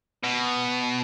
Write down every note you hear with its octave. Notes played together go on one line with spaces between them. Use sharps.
B2